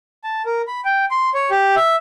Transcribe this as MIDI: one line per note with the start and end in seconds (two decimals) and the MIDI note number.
0.24 0.42 81
0.45 0.62 70
0.67 0.80 83
0.85 1.05 79
1.11 1.30 84
1.34 1.50 73
1.51 1.75 67
1.76 1.96 76